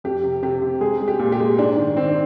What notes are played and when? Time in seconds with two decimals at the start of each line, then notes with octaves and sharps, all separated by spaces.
0.04 F2 G4
0.24 C3
0.43 C3 G4
0.62 C3
0.81 G#3 G#4
1.00 G#3
1.08 G4
1.19 A#2
1.32 G4
1.40 G#3
1.58 G#2 D4
1.77 D#3
1.96 D#3 C4
2.09 D4